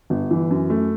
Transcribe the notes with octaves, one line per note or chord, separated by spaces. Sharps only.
G1
E3
F#2
A3